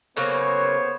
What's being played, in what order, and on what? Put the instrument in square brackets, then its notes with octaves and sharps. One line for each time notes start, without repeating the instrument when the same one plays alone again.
[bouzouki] C#3 F#3 A#3 [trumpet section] B3 C5 C#5